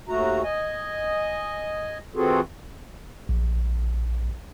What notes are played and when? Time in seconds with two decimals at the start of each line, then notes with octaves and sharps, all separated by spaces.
0.09 D#2 A3 F#4 A#5
0.43 D#5 G#5
2.16 E3 C4 F4 F#4 G#4 A4
3.29 A#1